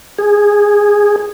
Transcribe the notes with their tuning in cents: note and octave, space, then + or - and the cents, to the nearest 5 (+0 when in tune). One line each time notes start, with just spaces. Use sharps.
G#4 -10